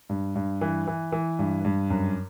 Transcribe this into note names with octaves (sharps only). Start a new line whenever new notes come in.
G2
G2
E3
E3
E3
G2
G2
F#2